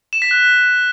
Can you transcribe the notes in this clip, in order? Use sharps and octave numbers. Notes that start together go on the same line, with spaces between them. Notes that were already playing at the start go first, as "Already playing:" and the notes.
E7
B6
F#6